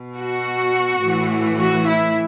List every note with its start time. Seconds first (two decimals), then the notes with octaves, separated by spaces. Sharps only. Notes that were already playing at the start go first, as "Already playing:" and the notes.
Already playing: B2
0.14 F#4
1.01 A2 E3
1.58 F#4
1.88 E4